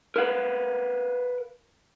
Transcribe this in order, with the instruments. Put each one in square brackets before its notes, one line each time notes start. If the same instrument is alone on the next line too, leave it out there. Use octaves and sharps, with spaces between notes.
[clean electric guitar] A#4 B4 F5 F#5